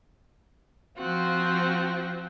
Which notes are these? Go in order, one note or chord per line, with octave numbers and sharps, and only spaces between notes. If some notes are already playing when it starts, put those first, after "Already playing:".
F3 C4 F4 F#4